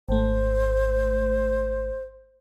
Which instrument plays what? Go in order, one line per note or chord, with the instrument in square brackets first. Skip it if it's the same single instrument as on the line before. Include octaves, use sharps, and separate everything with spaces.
[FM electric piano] G#1 A3 [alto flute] C5